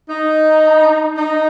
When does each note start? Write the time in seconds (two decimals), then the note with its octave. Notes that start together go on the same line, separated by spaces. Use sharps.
0.08 D#4
1.17 D#4